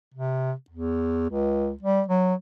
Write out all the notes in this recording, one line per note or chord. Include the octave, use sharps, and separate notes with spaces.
C3
E2
C#2
G3
F#3